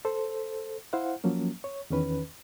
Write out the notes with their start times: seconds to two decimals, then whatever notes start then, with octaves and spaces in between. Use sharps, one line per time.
0.05 A4 C5
0.93 E4 C5 F5 F#5
1.24 F3 F#3 A#3 C#4
1.64 C#5
1.90 E2 D#3 C#4 B4